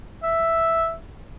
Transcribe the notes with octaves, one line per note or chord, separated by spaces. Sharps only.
E5